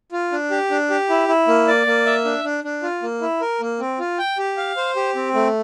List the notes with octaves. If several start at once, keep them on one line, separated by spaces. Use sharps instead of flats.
F4
D4
G4
D4
G4
E4
E4
A#3
D5
A#3
E5
D4
D4
D4
F4
A#3
E4
A#4
A#3
C4
F4
G5
G4
F5
C5
G4
C4
A3